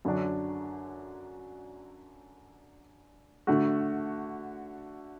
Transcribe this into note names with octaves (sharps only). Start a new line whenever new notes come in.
F#2 D3 F#3 D4
D3 A3 F#4